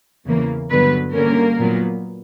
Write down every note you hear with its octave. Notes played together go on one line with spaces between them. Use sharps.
E2 C#3 E3 A#3
G2 D3 F#3 B3 B4
D3 G3 A#3 C#4 A#4
A#2 F#3 B3